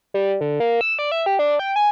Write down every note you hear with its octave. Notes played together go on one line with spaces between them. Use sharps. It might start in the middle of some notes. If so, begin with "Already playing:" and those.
G3
D3
A#3
E6
D5
E5
G4
D4
G5
G#5